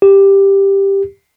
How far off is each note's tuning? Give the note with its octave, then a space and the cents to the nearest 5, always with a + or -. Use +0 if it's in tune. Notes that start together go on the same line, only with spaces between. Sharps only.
G4 +5